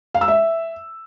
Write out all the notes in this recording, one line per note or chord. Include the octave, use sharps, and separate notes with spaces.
F5
E6
E5